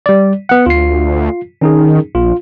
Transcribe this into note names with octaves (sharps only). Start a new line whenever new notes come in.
G3 D5
B3 F#5
D2 F4 C7
D#3 C#4 D#4 G#4
A#1 F4